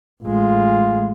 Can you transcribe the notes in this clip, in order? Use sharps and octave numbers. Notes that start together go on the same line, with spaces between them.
A1 G#3 F4